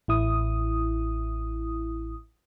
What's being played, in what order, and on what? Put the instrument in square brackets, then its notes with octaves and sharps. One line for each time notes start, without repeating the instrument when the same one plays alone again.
[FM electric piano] A1 E4 D#6